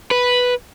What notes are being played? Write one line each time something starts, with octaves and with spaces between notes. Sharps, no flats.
B4